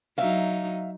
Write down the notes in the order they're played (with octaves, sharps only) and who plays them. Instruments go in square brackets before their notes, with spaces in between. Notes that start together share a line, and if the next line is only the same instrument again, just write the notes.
[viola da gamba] F#3 D#4 [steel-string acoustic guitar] E5 F5